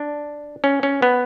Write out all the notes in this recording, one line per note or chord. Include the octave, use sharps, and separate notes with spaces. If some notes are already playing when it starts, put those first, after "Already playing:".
Already playing: D4
C#4
C#4
B3